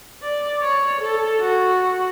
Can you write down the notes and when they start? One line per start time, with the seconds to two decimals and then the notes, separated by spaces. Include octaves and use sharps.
0.23 D5
0.63 C#5
1.01 A4
1.41 F#4